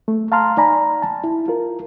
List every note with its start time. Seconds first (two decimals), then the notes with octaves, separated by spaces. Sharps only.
0.08 A3
0.32 F5 A5 A#5 C6 F6
0.57 D#4 D5 G#5 A#5 B5
1.02 A5
1.24 E4
1.48 F4 A#4